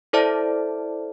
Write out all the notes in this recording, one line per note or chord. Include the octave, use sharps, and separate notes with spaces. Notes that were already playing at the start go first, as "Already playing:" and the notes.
E4 A4 C5 D5 E5 A5